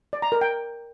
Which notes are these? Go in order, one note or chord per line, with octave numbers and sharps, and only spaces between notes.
D5
A#5
A#4
G5